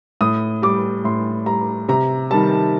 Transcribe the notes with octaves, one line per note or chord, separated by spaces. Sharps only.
A2 D#6
G3 D6
A2 C6
G3 A#5
C3 A#5
D#3 G3 A5